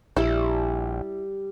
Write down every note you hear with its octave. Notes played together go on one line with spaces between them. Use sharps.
A#1 G3 E4 A5